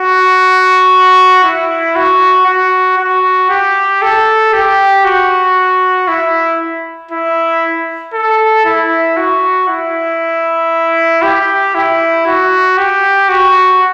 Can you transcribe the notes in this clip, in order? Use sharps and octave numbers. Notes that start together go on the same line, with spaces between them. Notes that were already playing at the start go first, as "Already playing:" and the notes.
Already playing: F#4
E4
F#4
F#4
F#4
G4
A4
G4
F#4
E4
E4
A4
E4
F#4
E4
G4
E4
F#4
G4
F#4